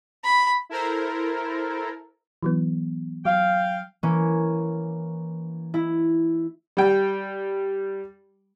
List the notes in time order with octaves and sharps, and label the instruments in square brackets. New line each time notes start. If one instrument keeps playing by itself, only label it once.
[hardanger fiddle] B5
[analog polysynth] E4 A4 A#4 C5
[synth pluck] E3 F#3 B3
[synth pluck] F#3 [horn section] F5 G5
[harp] E3 A#3 C#4
E4
[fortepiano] G3 G5